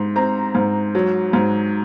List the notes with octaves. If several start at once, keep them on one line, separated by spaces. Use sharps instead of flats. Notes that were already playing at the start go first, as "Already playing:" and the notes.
Already playing: G#2 C6
C4 A#5
G#2
F#3
G#2